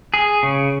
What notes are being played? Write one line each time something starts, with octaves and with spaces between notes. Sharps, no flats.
G#4
C#3